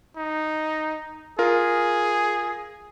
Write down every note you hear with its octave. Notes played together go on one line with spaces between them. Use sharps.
D#4
F4 G#4 A#4